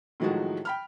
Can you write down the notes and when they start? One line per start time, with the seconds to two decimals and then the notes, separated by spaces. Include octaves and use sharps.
0.20 A2 D#3 F3 F#3 G#3 F#4
0.65 G5 B5 F6